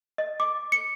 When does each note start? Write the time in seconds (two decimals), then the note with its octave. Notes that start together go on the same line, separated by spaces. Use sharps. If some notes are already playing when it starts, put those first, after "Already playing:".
0.18 D#5
0.40 D6
0.72 C#7